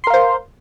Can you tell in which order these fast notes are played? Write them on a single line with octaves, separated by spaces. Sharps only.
C6 A#4 F5 C5